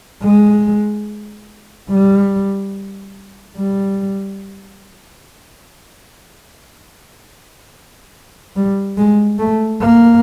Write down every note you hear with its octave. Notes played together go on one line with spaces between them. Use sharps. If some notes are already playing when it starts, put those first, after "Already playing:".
G#3
G3
G3
G3
G#3
A3
A#3